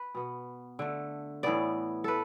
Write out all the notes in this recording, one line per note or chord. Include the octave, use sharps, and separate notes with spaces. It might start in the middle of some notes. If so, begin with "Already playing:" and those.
Already playing: B4
B2 B3
D3 A3
A2 E3 B3 D5
A3 A4 B4